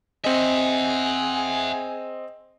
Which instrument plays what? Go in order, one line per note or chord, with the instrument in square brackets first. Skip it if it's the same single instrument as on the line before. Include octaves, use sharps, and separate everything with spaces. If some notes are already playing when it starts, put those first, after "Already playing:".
[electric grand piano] C4 D#5 [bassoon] G#4 [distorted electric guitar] E5 F#5